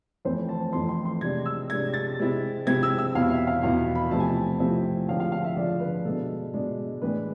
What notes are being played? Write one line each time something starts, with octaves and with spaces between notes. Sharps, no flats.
F2 E3 A3 C4 C5
A5
F2 E3 A3 C4 C6
C6
C6
C3 G#3 D4 G#6
E6
C3 G#3 D4 G#6
A6
C3 G#3 C4 E4
C3 G#3 C4 E4 G#6
E6
E6
E2 B2 B3 E4 F5
E5
F5
E2 B2 B3 E4 F5
B5
C3 F3 A3 C4 E4 A5
G#5
A5
C3 F3 A3 C4 E4
D3 F3 G#3 F5
F5
F5
E5
D3 F3 G#3 D5
B4
B2 G#3 D4 A4
B2 G#3 D4
A2 E3 G#3 D4 B4